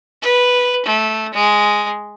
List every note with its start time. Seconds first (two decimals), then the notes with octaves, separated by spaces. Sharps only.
0.22 B4
0.86 A3
1.34 G#3